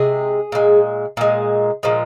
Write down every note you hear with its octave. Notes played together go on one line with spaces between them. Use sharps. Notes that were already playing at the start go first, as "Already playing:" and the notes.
Already playing: C3 G#3 G#4
A#2 G#3
A#2 G#3
A#2 F3 G#3